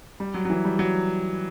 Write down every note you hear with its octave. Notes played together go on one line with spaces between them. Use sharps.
G3
F#3
F#3
E3
G3
F#3